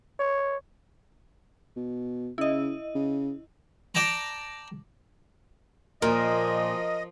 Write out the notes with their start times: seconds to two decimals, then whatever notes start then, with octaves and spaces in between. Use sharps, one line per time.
0.20 C#5
1.76 B2
2.38 C#3 E4 D#5
2.95 C#3
3.95 D5 G5 A5 A#5
6.02 A#2 F3 A#4 D#5